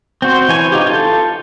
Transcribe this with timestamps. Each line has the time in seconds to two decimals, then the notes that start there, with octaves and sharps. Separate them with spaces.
0.22 C4 F#4 C5
0.49 E3 C#5 G#5
0.72 D#4 F4 G4
0.87 F4 A4